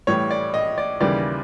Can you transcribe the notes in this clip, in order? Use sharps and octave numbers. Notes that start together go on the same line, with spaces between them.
A2 E3 G3 C#5
D5
D#5
D5
D#2 C#3 E3 G3 D5